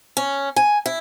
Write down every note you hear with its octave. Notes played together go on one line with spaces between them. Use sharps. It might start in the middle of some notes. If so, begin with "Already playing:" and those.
C#4
G#5
E4